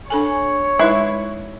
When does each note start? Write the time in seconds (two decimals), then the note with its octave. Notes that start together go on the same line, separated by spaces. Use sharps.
0.10 D4 A4 C#5 G#5
0.79 G#3 D#4 E4 B4